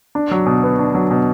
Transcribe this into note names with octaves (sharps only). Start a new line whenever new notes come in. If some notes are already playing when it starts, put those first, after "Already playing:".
D4
F#3
B2
B3
D4
F#3
B2